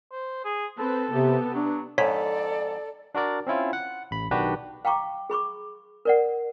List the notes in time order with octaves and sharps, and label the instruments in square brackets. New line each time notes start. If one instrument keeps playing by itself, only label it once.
[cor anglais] C5
G#4
[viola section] C4 B4 [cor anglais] A4
[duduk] C3 [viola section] B3 G4
[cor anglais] F#3 [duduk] D4
[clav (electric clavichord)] F2 G#2 [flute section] A4 D5 [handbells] C#5 B6
[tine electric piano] D4 F#4 A#4 D5
C4 C#4 E4 F4
F#5
A1 B5
B1 D#3 D4 F#4 G4 B4
[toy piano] F5 G5 A#5 C#6 D6
G#4 B5 C#6 D6
A#4 D5 F#5